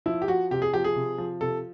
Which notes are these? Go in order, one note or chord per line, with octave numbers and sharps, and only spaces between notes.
F3 E4
G4
F3 F#4
C3 G4
G#4
F3 G4
G#4
C3
F3
C3 A4